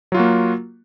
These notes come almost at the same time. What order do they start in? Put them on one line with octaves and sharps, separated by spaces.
F#3 F4 F#4 A#3